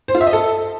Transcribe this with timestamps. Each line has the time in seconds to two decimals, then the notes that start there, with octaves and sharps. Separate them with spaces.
0.08 C5
0.14 F4
0.21 E5
0.27 D#5
0.33 A4